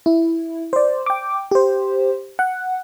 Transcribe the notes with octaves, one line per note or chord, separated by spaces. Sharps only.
E4
C5 D5
G5 D6
G4 C5
F#5